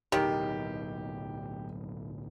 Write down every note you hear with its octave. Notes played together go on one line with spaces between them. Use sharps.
D1 B1 D#3 G4